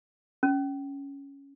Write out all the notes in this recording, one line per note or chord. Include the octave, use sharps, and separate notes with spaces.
C#4